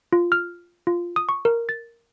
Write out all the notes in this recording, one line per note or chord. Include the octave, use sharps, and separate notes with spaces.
F4
F6
F4
D#6
C#6
A#4
A6